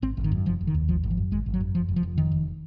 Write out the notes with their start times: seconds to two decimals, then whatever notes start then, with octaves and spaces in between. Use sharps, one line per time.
0.02 G#1 C4
0.17 G#1
0.24 D#3
0.31 F#2
0.46 F1 F3
0.61 F1
0.67 D#3
0.74 D#2
0.88 G#1 F3
1.03 G#1
1.11 F3
1.17 F#2
1.31 G#1 G#3
1.46 G#1
1.54 F#3
1.61 F#2
1.75 F1 F3
1.89 F1
1.96 F3
2.03 F2
2.18 F1 D#3
2.32 F1